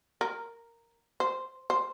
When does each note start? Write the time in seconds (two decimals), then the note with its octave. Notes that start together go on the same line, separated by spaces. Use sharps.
0.21 A#4
1.20 C5
1.70 C5